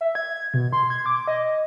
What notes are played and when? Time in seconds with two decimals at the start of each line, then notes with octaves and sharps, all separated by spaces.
0.01 E5
0.15 G#6
0.54 B2
0.73 C6
0.90 G#6
1.06 D6
1.28 D#5